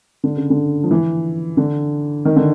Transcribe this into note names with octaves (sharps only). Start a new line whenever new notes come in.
D3
C#3
D3
F3
E3
D3
D#3
D3